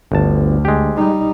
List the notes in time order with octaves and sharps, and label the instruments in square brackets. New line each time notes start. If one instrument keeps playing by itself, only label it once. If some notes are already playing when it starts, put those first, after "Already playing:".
[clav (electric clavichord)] G1 A5 [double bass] D2
[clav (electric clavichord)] G#3 G4
[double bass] G3 D#4